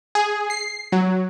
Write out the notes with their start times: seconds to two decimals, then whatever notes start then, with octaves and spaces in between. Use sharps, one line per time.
0.15 G#4
0.50 C7
0.92 F#3